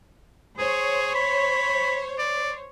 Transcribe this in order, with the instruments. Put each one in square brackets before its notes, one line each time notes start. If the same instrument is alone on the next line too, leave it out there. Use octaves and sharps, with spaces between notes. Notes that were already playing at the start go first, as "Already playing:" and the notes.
[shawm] G#4 [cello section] C5 C#5
[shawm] B5
D5